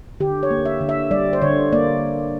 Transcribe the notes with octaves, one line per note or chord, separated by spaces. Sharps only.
D3 G4
C#5
A#3
E5
D3
E5
G3 D5
C5
D3 C#5
A#3 D5